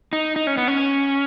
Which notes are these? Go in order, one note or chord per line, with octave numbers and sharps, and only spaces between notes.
D#4
D#4
C#4
B3
C#4